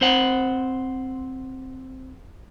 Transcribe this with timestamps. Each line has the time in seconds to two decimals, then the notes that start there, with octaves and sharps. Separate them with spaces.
0.01 C4 C5 F#5